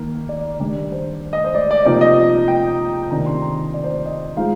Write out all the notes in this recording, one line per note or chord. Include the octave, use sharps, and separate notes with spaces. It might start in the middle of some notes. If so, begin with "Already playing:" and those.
Already playing: D#3 A#3
D5
D#3 G3 D4
C5
D#5
C5
D5
D5
C3 F3 A#3 D#4 D5
D#5
G5
C3 D#3 A#3 D4 A#5
C6
A#5
D5
C5
D#5
F3 G#3 D#4 F5